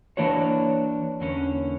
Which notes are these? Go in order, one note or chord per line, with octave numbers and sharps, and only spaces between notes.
E3 A#3 D4 F#4 C#5
E2 D3 A#3 C#4